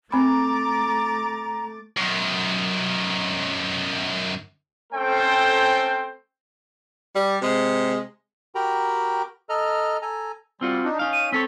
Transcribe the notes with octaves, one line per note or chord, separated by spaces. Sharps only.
A3 C4 A#5 B5 D6 A6
F#2 D#3
A3 C4 C#4 A4 C5 G5
G3
C3 G#3
F#4 G4 A#4 G5 A#5 B5
A4 D#5 A#5 F6
A4 G#5 A#5
G3 C4 F4 F#4
D4 D#4
C#4 D#4 F5
D#7
C4 A4 C#5 B6